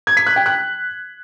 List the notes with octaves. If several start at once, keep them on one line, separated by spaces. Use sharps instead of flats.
G#6
B6
F#6
G5
F#6